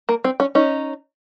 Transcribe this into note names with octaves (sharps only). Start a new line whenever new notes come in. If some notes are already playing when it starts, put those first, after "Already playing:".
A#3
C4
C#4
C#4 D#4